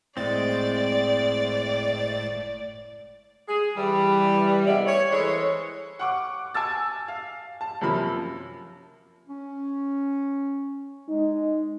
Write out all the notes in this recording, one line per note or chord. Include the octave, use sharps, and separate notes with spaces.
F#1 A2 G#3 C4 D5 A6
G#4
E3 G3
D2 C3 G#3 B3 D5 E5
C#5
E3 G#3 A4 C5 C#5
F#5 C#6 D6
G#5 A5 E6 A6
F5
A5
F#2 C3 F3 A#3 B5
C#4
G#3 D#4